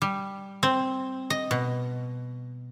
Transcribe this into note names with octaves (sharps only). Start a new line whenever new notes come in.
G3
C4
D#5
B2